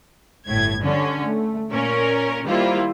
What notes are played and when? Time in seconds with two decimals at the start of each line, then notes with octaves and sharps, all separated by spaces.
0.48 G1 A2 G#6
0.84 D3 G3 C#4
1.24 A3
1.71 A#2 C#4 A#4
2.47 D#3 G3 A#3 E4 F4 C5